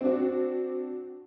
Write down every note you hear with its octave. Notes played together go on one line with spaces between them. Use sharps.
C4 D4 F#4